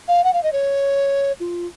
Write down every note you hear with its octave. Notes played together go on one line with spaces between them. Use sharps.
F5
F#5
F5
D#5
C#5
F4